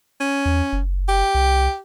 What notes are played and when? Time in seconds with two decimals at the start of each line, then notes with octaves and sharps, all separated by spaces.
0.21 C#4
0.45 E2
0.73 F#1
1.09 G4
1.34 C2